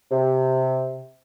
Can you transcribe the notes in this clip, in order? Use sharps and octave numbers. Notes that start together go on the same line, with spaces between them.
C3